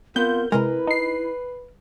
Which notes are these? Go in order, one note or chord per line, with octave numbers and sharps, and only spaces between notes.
B3 C4 F4 A#4 G6
C3 G#3 E4 A#4 B4 D#5 A#5
D#4 C7